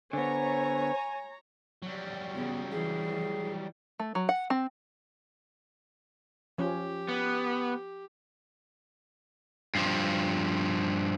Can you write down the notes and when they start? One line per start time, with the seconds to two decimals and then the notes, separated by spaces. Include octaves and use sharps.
0.13 D3 B3 C5 C#5 G#5 A#5
1.82 F#3 G3
2.35 C#3 B3
2.72 E3 G#4
4.00 A3
4.15 F#3
4.29 F#5
4.50 C4
6.58 F3 C#4 G4
7.08 B3
9.75 G2 F3